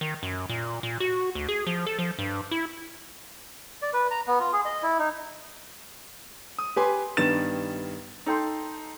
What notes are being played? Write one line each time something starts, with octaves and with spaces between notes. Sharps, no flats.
D#3
F#2
A#2
A#2
F#4
D2
G#4
F3
A4
F3
G2
E4
D5
B4
A#5
B3
F4
G#4
D#5
E4
D#4
D#6
G4 B4 G#5 C6
G2 D#3 G3 B3 A6 E7
D#4 A4 G5 C6